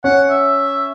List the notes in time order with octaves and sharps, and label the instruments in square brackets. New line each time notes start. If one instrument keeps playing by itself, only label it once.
[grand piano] C#4 [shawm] F#5
[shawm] E5